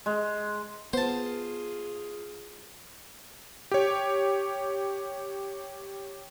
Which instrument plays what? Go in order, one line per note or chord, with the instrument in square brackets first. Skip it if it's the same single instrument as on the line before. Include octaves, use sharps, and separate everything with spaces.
[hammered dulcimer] G#3
[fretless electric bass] B3 [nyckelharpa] F4 G#4 [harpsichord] C5 A5
[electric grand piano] G4 C#5